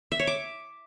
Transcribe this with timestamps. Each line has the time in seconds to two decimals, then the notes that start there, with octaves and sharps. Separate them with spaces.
0.12 E5
0.19 C#5
0.27 D6